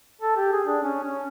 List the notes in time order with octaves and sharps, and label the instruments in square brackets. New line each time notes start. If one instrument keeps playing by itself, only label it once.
[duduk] A4
G4
G#4
D4
C#4
C#4